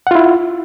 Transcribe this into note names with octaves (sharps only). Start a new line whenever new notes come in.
E4 F4 F#5